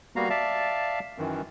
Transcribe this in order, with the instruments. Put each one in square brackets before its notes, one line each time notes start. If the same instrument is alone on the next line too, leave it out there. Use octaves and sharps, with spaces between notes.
[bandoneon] G3 A#3 B3 F#4 F5 A#5
D5 E5 F5 A5
F#2 D#3 E3